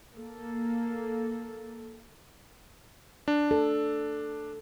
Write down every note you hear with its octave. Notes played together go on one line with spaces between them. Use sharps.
A#3 A4
D4
A4